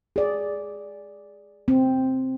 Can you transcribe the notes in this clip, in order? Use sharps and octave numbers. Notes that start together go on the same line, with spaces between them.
G#4 D5
C4